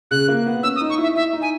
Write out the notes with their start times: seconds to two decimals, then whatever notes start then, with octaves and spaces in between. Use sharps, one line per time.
0.11 C#3 F#6
0.28 A#3
0.46 B3
0.63 C#4 E6
0.76 D#6
0.81 D#4
0.90 C#6
0.98 E4 E5
1.15 E4 E5
1.33 D#4
1.42 G#5